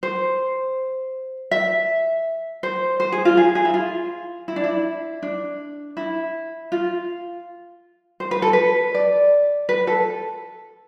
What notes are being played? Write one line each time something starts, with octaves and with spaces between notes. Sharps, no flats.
C5
E5
C5
C5
G#4
F4
G#4
G#4
E4
F4
E4
D4
E4
D4
E4
F4
C5
B4
A4
B4
D5
B4
A4